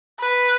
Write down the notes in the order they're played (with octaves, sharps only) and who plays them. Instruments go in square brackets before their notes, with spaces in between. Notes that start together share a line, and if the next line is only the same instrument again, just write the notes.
[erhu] B4